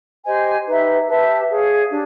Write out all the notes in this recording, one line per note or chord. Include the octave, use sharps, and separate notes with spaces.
G4 C5 D#5 G#5
D#4 G4 B4 E5
G4 B4 E5 A5
G#4 C#5 F5
D4 G4